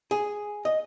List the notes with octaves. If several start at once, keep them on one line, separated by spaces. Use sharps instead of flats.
G#4
D#5